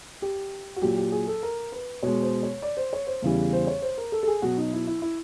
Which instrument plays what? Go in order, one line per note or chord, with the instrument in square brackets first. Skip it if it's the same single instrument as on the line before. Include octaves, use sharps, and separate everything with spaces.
[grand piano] G4
F#4
A#2 F#3 G4
G4
G#4
A4
A#4
B4
B2 G#3 C#5
C5
C#5
D5
C5
C#5
C5
E2 C#3 E3 G3
C5
C#5
C5
A#4
A4
A4
G#4
B2 F#3 F#4
D#4
E4
E4
E4